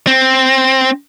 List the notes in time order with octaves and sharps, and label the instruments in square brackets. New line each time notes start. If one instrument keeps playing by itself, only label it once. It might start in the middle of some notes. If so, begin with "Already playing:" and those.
[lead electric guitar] C4